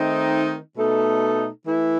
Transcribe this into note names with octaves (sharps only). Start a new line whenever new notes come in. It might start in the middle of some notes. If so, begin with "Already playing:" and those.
Already playing: D#3 A3 C4 D#4
B2 A3 D#4 A4
E3 A3 E4